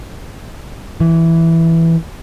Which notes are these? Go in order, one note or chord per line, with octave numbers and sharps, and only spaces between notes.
E3